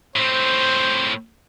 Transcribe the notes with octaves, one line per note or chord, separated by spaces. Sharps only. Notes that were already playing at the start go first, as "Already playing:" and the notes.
A2 C4 C5